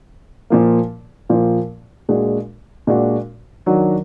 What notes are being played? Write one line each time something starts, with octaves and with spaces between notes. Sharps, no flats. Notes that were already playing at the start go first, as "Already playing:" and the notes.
A#2 F3 A#3
A#2 F3 A#3
A#2 G#3 D4 F#4
A#2 G#3 D4 F#4
D#3 F#3 D4 F#4